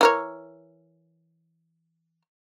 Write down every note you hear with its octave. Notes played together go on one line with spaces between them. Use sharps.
E3 A#4 C#5